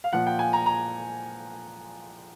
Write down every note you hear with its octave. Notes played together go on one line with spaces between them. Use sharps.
F5
A#2 F3 F#5
G5
G#5
A#5
A#5